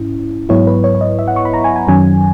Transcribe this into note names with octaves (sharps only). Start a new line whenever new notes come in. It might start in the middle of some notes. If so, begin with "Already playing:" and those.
Already playing: G#2 C#4 E4
G#2 F#3 B3 E4 C#5
B4
C#5
C#5
D#5
E5
F#5
C#6
B5
A#5
G#5
G#5
F#2 D#3 F#3 C#4 G#5